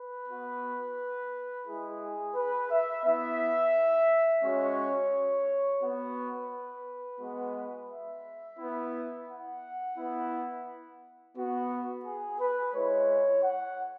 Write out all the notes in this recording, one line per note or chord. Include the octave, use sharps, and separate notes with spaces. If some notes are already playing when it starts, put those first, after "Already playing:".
Already playing: B4
B3 F#4
G#3 E4 G#4
B4
E5
B3 E4 E5
G#3 C#4 F#4 C#5
B3 F#4 B4
G#3 B3 F#4
E5
B3 E4
F#5
B3 E4
B3 F#4
G#4
B4
G#3 E4 C#5
F#5